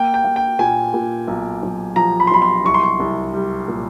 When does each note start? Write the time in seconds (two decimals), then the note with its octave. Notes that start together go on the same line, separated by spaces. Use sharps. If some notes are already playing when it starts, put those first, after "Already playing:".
Already playing: A#3 G5
0.14 G5
0.24 A#3
0.36 G5
0.59 A#2 G#5
0.94 A#2
1.27 B1
1.63 B1
1.96 F3 A#5
2.20 B5
2.27 C6
2.31 B1 B5
2.42 C6
2.65 C2 C#6
2.74 C6
2.83 C#6
3.00 C2
3.33 G3
3.68 A#2